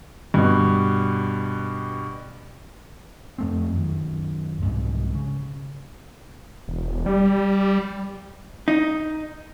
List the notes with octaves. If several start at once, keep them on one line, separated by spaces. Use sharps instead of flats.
G2 B2
F2 A3 C4
F#2 D#3
C2 G#2 B2
C#3
E1
G3
D#4